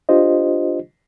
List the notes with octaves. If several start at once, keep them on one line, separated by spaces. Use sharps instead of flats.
D4 F4 G4 C5 D#5